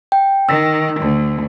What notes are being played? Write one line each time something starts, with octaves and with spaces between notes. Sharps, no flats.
G5
D#3 E6
D2